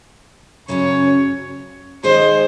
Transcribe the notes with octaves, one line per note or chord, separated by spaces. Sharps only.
F#2 C#3 F#3 C#4 C#5
D#3 G#3 D#4 G#4 C5 C#5